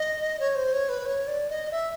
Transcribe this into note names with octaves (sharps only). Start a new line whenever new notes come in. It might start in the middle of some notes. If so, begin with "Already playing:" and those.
Already playing: D#5
C#5
C5
C#5
B4
C#5
D5
D#5
E5